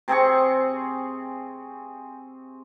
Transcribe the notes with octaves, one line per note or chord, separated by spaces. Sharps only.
C3 C4 G#4 C#6